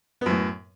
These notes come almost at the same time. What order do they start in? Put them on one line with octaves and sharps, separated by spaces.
B3 F#2 A2